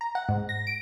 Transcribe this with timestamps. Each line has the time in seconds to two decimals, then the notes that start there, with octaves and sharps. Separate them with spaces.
0.01 A#5
0.15 F#5
0.29 G#2
0.49 A#6
0.67 D7